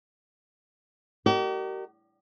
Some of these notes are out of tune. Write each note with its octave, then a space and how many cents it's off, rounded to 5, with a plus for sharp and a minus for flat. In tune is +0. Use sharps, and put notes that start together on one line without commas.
G4 -45 A#4 -25 D#5 -45